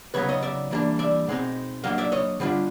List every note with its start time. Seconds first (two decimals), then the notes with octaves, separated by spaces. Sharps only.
0.14 C#3 F#3 B3 D#4 B4 C#5
0.29 C#5 D#5
0.43 D5 E5
0.71 E3 G3 A#3 D4
0.99 D5 E5
1.27 B2 G#3 C4 D#4
1.84 F#3 A#3 D4 D#5 F5
1.98 D5 E5
2.12 C#5 D#5
2.40 D3 G3 B3 D4 F4